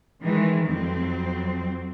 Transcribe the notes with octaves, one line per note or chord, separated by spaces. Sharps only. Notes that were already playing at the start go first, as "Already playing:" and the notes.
D#3 E3 G#3
F2 F#3 C4